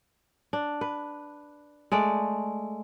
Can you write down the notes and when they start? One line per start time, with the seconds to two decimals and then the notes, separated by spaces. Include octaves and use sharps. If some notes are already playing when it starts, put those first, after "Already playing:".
0.53 D4
0.81 B4
1.92 G#3 A3 D5